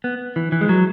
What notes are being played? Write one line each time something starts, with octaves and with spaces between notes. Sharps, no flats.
B3
E3
E3
G#3
F#3